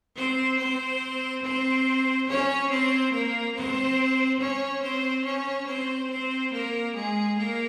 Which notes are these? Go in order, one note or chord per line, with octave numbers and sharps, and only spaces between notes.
C4 C5
C4 C5
C4 C5
C#4 C#5
C4 C5
A#3 A#4
C4 C5
C#4 C#5
C4 C5
C#4 C#5
C4 C5
C4 C5
A#3 A#4
G#3 G#4
A#3 A#4